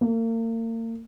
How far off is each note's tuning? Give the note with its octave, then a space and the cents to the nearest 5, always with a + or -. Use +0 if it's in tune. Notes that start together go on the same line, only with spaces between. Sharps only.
A#3 -40